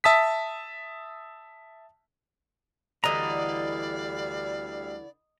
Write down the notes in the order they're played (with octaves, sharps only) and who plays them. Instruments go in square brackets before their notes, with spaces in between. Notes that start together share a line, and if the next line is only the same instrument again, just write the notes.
[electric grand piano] E5 A5 D#6 B6
[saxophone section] D2 G3 F5 [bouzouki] D3 E3 [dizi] D5 [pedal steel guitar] D#5 A#5